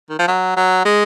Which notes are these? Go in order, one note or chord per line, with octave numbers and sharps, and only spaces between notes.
D#3
F3
F#3
F#3
G#3